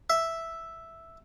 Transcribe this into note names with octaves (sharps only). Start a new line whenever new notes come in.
E5